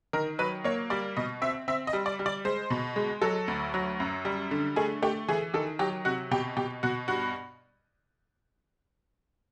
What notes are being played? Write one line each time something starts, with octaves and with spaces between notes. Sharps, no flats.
D#3 A#4
F#3 B4
A#3 C#5
G3 D5
B2 D#5
C4 E5
C4 E5
D#5
G3
D5
G3
D5
G#3 C5
B2
G#3
F#3 A4
D2
F#3
F#2
G3
D3
A3 G#4
A3 G4
E3 G#4
D#3 A4
F#3 G4
C3 F#4
B2 G4
B2 G4
B2 F#4
G2 F#4